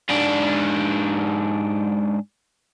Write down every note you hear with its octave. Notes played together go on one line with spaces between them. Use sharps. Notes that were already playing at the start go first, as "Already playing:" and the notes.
G#2 D4